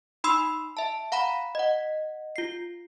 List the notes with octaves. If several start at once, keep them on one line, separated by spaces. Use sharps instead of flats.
D#4 B5 C6 D#6 E6 C7
E5 A5
F5 F#5 A#5 B5
D#5 F#5
F4 C7